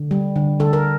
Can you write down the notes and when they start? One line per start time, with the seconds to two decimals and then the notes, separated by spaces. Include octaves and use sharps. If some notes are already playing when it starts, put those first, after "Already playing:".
Already playing: D3
0.11 G3
0.36 D3
0.60 D3 A4
0.73 A#4